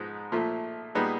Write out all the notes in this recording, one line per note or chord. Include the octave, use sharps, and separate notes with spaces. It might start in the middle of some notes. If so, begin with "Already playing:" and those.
Already playing: G#2 F3 G#3 B3 D#4
A#2 F3 A3
A#2 G3 B3 D#4 G#4